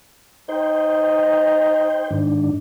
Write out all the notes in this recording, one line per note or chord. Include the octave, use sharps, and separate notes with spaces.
D#4 C5 G5
G#2 D#3 D4